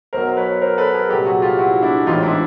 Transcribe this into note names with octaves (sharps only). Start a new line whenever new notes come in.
B1 B2 F#3 A#4 C5
B4 C#5
A#4 C5
A4 B4
G#4 A#4
C2 A#2 F#3 G4 A4
F#4 G#4
F4 G4
E4 F#4
D4 E4
A1 G#2 E3 D#4 F4
D4 E4